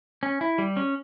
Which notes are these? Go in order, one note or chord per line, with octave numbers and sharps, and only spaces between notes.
C#4
E4
G3
C#4